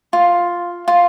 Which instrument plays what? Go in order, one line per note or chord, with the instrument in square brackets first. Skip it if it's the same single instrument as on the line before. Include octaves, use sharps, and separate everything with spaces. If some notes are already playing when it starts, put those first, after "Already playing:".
[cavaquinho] F4
F4